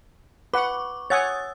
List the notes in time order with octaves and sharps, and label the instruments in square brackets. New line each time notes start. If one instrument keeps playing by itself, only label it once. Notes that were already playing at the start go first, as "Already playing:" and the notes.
[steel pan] B4 F#5 [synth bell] C#6 D6
[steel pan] C#5 F#5 G#5 [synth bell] D#6 E6 A6